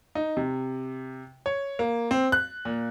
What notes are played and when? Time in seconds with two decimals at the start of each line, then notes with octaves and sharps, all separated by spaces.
0.15 D#4
0.37 C3
1.46 C#5
1.79 A#3
2.11 C4
2.32 F#6
2.65 A#2